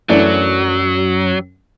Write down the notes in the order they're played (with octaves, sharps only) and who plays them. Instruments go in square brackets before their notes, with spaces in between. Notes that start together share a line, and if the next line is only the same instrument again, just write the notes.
[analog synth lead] F#2 [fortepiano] E3 A3 D4 [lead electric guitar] F#3